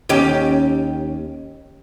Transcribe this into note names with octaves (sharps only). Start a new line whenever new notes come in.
D#2 C#4 G4